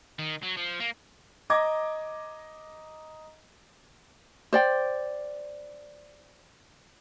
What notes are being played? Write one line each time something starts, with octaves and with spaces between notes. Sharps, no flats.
D#3
F#3
F3
A#3
D#5 A#5 D6 G#6 A#6
C5 D5 G5